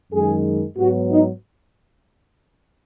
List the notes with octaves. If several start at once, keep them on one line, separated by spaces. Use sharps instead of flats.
F#2 D#3 G#3 G#4
G#2 F#3 B3 F#4
D#4